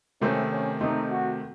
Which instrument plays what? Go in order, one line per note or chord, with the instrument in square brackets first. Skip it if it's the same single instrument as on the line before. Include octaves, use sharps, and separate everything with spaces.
[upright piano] C3 D#3 A3 C4 [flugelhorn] C#4
[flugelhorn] C#4
[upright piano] C3 D#3 A3 C4 [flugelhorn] D#4
[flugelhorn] F#4